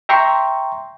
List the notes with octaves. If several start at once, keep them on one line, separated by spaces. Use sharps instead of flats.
E5 G5 A#5 C6 C#6